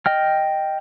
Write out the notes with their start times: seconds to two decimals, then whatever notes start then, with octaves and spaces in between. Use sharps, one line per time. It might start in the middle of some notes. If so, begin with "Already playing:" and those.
0.06 D#5 G5 F6